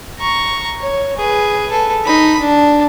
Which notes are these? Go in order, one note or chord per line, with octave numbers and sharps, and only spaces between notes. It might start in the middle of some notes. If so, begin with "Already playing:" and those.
A#5 C#6
C#5
G#4 B4
A4 B4
D#4 B5
D4